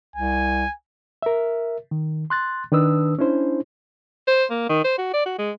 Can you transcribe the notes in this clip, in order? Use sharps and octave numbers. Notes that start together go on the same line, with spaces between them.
C2 G#5
A#4 E5
D#3
C6 F#6 A6
D#3 D4 B4 D#6 E6
C#4 D4 E4 C5
C5
A#3
D#3
C5
F#4
D5
F#4
G#3